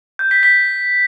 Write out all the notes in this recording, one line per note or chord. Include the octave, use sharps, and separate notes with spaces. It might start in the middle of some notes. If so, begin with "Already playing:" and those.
G6
B6
B6